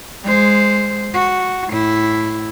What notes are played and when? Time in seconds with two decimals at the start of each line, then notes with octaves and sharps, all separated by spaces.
0.24 G#3 C5
1.14 F#4
1.68 A2 E4